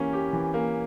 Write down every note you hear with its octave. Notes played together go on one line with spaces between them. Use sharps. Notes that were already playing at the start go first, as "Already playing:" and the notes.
Already playing: E3 A#3 C#4 G4
G4
E3
A#3